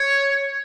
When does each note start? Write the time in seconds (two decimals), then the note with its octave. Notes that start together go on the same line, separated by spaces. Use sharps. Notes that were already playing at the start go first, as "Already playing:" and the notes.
Already playing: C#5